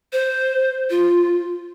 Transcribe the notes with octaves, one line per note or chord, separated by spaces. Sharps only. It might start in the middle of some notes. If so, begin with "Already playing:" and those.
C5
F4